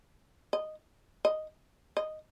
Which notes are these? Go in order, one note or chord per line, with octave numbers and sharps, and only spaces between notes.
D#5
D#5
D#5